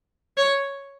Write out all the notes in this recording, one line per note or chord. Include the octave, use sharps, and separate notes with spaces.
C#5